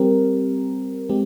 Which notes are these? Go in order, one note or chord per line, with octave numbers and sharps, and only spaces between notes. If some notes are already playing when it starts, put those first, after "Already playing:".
Already playing: G3 C4 G4 A#4
G#3 C4 G4